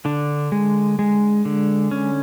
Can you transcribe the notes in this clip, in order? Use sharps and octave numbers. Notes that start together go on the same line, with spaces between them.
D3 D4
G#3
G#3
D3
C#4